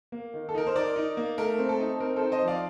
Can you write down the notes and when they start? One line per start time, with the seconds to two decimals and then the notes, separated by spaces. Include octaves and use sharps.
0.12 A#3
0.34 D#3
0.49 A4
0.55 D#4 A#4
0.67 C5
0.76 D#4 A#4 D5
0.96 D#4
1.17 A#3
1.38 A3 A#4
1.59 C4
1.69 A4
1.80 D#4
2.00 C4 A#4
2.16 A4 C5
2.22 D#4
2.32 C5 D#5
2.42 F3
2.48 D5 F5